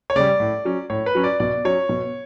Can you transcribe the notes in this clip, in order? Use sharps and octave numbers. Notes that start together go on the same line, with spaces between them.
C#5
C#3 G3 D5
A2
F#3 C#4
A2 C#5
B4
F#3 C#4
D5
B2 D5
F#3 C#4 C#5
B2